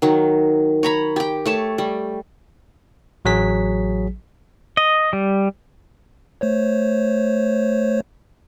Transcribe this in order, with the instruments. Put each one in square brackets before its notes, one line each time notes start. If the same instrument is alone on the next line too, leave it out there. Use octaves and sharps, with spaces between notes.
[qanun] D#3 F#3
C#5 A#5 B5
G4 G5
A3 C#5 A5
G3
[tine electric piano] A1 F#3 G#4 B6
[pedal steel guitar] D#5
G3
[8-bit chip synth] A3 C5 C#5